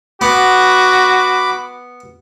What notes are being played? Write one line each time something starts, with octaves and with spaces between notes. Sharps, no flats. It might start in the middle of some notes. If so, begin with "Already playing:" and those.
B3 F#4 B5 D6